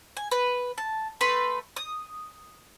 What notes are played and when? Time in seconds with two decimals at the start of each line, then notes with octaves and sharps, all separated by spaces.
0.17 G#5
0.31 B4
0.78 A5
1.21 A3 B4 B5 C6
1.77 D#6